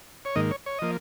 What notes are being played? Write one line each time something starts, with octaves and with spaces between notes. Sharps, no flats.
C#5
G#2 D#3 A#3 D#5
C#5
C#5
F3 A#3 D#5